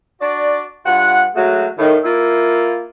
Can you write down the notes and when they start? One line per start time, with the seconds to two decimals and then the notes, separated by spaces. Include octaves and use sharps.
0.20 D4 F#4 D5
0.85 G2 F4 F#5
1.36 F#3 G#3 A3 F#4
1.78 A2 D#3
2.04 A#3 E4 F4